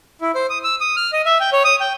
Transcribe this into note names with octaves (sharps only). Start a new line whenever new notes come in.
E4
C5
D#6
E6
D#6
F6
D#5
E5
G5
C#5
D#6
G5